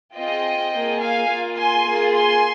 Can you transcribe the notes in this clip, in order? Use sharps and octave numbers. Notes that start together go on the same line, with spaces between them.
C4 F4 G#4 D#5 G5
A#3 F4 G#4
F5 G#5
A#3 F4 G#4
G#5 C6
A#3 F4 G#4
G#5 C6